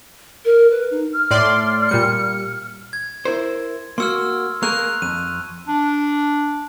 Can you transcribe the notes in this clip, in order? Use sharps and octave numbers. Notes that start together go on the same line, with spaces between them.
A#4
B4
D#4
F6
A2 D5 C6
A#2 G3 C#7
G#6
E4 A#4 C5
A#3 F#4 C6 E6 F6
A#3 G#4 A#4 C#6 F#6 F7
F2 D#7
D4